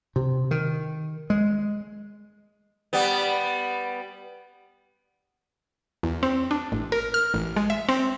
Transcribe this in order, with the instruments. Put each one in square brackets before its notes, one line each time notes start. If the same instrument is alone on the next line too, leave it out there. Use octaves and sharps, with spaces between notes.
[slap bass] C3
D#3
G#3
[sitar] G3 B3
[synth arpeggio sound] E2
C4
D4
A1
A#4
F6
A1
G#3
E5
C4